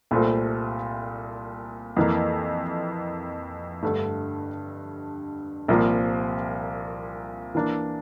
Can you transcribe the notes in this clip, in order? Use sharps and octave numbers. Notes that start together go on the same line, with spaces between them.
C2 A#2 A3 C4 F4
F2 E3 A#3
G2 D3 A3
C2 A#2 F3 A#3
E3 A#3 D4